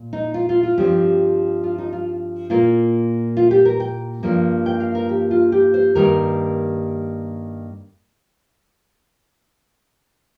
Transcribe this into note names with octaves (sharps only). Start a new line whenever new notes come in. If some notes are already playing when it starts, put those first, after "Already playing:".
Already playing: A#2
D#4
F4
F4
F4
G2 F3 C4 G4
F4
D#4
F4
A#2 A#3 F4
F4
G4
A#4
G5
G2 F3 A#3
G5
F5
A#4
G4
F4
G4
C5
G2 D#3 G3 A#3 A#4